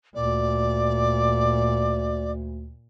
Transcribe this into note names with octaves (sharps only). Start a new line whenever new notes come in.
D2 A#2 D5